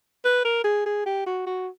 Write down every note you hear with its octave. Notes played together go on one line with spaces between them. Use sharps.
B4
A#4
G#4
G#4
G4
F#4
F#4